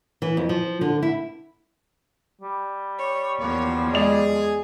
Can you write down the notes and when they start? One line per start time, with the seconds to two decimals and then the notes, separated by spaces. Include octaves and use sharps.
0.22 E3
0.37 F2
0.49 F3
0.81 D3
1.03 E4
2.41 G3
2.98 C#5
3.40 E2 F3 A#3 B3 C#5
3.93 G#3 G#4 D5 F7